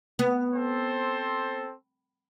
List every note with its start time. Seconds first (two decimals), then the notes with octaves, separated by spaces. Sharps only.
0.19 B3
0.54 C4 A4 C5